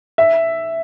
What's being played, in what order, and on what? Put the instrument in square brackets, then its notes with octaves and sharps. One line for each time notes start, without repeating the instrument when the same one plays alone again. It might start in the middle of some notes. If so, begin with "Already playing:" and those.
[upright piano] E5